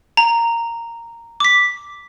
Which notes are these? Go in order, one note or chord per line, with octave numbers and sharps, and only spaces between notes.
A#5
D6 B6